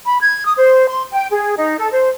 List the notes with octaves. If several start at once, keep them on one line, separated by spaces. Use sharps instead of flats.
B5
G#6
D#6
C5
C6
G5
G#4
D#4
A4
C5